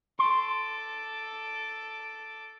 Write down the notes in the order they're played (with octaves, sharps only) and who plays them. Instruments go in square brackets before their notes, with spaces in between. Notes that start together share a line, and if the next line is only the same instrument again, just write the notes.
[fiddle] A4 D6 [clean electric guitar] C6